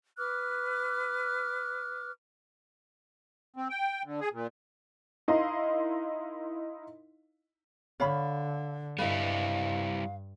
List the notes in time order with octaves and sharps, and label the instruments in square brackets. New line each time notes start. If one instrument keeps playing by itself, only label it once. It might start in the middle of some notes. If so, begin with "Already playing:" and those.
[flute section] B4 D6 F6 F#6
[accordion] C4
G5
D3
G#4
A#2
[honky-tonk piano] D#4 E4 A#4 D#5 F5 C6
[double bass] D3 [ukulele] C#5 F5 B5
[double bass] G2 [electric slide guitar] G3 E4 [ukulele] B4 D#5 [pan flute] F5